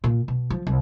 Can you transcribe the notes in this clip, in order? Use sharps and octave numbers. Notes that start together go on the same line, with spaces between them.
A#2
B2
F3
C2